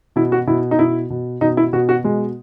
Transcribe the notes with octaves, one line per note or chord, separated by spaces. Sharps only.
B2 E4
F#4
B2 E4
D#4
B2 E4
B2
B2 D#4
E4
B2 F#4
F#4
B2 G#3